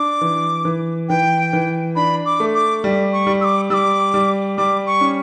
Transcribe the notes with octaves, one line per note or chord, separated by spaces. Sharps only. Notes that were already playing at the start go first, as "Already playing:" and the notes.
Already playing: D4 D6
E3
E3
E3 G5
E3
D4 B5
D6
A3
D6
G3
C#6
G3
E6
D6
G3 D6 E6
G3
G3 D6
C#6
C#4